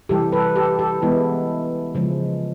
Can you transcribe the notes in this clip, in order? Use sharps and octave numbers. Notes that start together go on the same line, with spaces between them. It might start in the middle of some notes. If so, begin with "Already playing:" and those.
C3 E3 G3 G4 A4
A4 B4
G4 A4
G4 A4
E3 G#3 B3 E4
C#3 F3 G#3